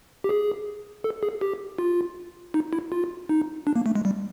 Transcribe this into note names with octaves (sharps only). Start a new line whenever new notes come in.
G4
G#4
A4
G#4
G4
F4
D#4
E4
F4
D#4
D4
A#3
A3
G#3
G3